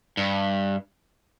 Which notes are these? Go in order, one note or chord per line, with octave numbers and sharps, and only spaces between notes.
G2